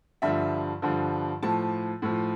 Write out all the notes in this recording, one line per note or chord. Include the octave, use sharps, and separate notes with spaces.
G2 D3 F3 E5
G2 D3 F3
A2 F3 A5
A2 F3